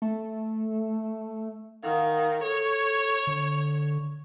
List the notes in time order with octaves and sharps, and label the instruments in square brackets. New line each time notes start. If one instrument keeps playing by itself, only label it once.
[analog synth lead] A3
[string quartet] D#3 [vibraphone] F5 F#5 D#6
[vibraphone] A4 [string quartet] C#5
[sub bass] D3 [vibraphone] C#6